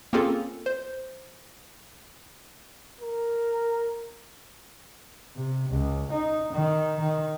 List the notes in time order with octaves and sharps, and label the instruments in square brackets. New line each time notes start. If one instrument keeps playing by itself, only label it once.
[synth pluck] A#3 C4 C#4 F4 G#4 A4
C5
[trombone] A#4
[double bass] C3
C#2
D#4
D#3
D#3